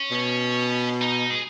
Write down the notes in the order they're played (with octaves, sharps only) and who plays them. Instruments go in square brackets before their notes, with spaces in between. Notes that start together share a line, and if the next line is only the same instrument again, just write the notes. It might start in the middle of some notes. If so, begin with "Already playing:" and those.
Already playing: [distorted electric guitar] C#4
[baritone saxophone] B2
[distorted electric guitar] D#4
G#4